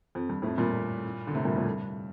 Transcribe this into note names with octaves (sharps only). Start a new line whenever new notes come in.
F2
G2
F2 A2
G2 A#2
D3
A2 C3
G2 A#2
F2 A2
G2